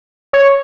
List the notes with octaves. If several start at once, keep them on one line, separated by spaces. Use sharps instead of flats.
C#5